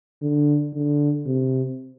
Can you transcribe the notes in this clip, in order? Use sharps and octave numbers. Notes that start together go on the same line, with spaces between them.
D3
D3
C3